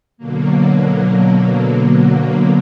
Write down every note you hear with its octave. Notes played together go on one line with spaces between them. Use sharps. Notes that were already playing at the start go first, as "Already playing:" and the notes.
B2 D3 F#3 A#3